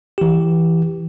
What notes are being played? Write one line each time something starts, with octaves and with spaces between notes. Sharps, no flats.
E3 G4